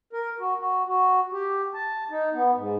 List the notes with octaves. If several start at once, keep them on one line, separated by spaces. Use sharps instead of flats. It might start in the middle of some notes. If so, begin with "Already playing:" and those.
A#4
F#4
F#4
F#4
G4
A5
D#4
B3
G#2